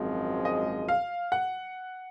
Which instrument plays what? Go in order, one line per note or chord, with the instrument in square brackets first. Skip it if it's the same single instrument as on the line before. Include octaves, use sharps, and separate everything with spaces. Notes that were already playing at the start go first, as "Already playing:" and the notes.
Already playing: [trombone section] G#1 F#2 F3 G#3 C4
[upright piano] D#5
F5
F#5